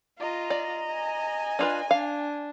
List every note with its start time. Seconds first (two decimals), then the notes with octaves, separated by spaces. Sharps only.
0.19 F4 D#5 A#5
0.50 D5
0.91 G#5
1.59 D4 F4 B4
1.91 D4 F5